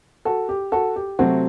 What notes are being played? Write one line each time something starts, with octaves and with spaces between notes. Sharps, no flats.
F#4 A4
G4
F#4 A4
G4
C3 F#3 A3 C4 F#4